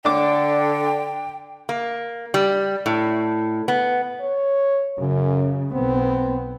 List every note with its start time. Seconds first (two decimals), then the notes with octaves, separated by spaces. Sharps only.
0.05 D3 D4 G5 D6
1.69 A#3
2.34 G3
2.86 A2
3.68 B3
4.21 C#5
4.98 F#2 C#3
5.73 B1 B3 C4